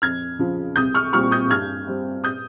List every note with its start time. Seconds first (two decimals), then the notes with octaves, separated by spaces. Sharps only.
0.02 F2 F6 G#6
0.39 C#3 F3
0.76 C2 D#6 G6
0.94 C#6 F6
1.13 A#2 G3 C4 C#6 F6
1.31 D#6 G6
1.50 G2 F6 G#6
1.87 G3 C4
2.24 D#6 G6